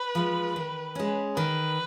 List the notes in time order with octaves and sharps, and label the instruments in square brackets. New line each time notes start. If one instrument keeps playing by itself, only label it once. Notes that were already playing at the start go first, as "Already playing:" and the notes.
Already playing: [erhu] B4
[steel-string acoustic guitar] F3 G#3
D#3
G#3 C#4
[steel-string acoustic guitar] D#3 [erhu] B4